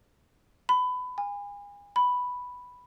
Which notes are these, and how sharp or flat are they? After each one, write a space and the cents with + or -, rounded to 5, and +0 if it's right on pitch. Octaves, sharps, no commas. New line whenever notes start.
B5 +20
G#5 -35
B5 +0